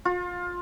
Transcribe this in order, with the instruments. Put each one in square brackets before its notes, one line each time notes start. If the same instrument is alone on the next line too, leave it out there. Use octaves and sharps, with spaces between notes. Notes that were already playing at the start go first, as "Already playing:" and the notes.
[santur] F4